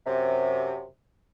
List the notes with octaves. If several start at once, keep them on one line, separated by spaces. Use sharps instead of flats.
F#2 C3